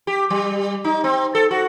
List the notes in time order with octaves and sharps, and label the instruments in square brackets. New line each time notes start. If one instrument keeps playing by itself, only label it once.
[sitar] G4
G3
D#4
C4
A4
F#4